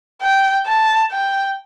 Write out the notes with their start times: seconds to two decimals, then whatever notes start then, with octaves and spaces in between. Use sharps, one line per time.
0.22 G5
0.67 A5
1.11 G5